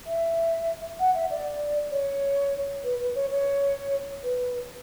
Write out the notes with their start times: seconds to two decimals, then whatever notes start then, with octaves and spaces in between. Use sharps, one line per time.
0.07 E5
1.00 F#5
1.15 E5
1.31 D5
1.92 C#5
2.84 B4
3.00 B4
3.15 C#5
3.31 C#5
4.24 B4